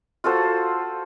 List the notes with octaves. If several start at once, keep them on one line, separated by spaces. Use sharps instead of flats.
F4 F#4 A4 C5